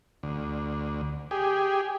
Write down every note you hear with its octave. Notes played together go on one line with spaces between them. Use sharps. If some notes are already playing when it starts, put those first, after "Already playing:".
D2
G4 G#4